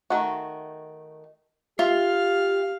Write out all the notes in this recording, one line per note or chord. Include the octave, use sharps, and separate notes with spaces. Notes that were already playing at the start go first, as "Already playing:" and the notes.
D#3 A3 F#4
F4 G4 E5 F5